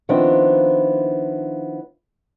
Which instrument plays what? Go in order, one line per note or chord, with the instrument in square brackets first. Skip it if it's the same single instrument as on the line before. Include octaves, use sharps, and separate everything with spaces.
[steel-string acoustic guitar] D#3 F3 B3 C4 D4 E4